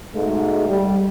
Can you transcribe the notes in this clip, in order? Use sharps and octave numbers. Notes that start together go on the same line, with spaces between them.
G#2 B2 G#3 A3
G3